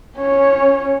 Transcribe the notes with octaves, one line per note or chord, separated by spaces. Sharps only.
C#4 C#5